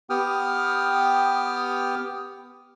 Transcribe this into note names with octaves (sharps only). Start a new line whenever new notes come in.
B3 G4 G5 D#6 F6